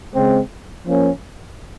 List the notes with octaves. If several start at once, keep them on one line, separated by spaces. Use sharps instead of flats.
C#3 G#3 C4
F3 A#3 C#4